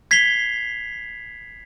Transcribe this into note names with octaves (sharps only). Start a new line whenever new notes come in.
G#6 B6 C7 F7 G7